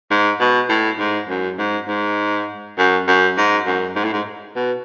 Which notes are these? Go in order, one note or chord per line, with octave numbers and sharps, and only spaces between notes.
G#2
B2
A2
G#2
F#2
G#2
G#2
F#2
F#2
G#2
F#2
G#2
A2
G#2
B2